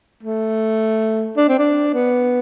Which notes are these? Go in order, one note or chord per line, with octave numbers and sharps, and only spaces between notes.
A3
D4
C4
D4
B3